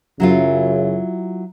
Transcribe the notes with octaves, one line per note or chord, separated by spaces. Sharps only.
F#2 C#3 F#3 E4 F4